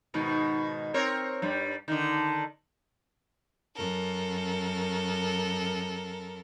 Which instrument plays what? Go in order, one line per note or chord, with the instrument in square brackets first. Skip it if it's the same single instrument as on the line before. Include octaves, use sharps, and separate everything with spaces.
[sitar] G#2 B2 D#3
C4 A#4 C#5
G2 G3
D3 D#3
[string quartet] F#2 A4 A#4